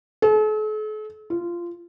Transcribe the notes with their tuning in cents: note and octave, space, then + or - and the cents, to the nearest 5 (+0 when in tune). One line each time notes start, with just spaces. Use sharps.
A4 -45
F4 -15